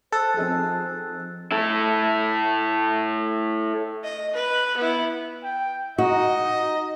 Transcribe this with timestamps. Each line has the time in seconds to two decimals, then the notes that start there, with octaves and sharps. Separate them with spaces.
0.12 A4 C5 E6 F#6 A6
0.37 F3 C4 D#4 G#4
1.52 E4 A4
4.04 D#5
4.33 B4
4.77 B3 E4
5.44 G5
5.98 D#4 F#4 D#5